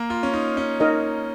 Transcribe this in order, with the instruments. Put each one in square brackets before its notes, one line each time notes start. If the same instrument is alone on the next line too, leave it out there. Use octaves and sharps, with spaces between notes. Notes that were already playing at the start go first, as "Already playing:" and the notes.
Already playing: [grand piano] A#3
F4
C#4
D#4
C#4
[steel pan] D#4 A#4 D#5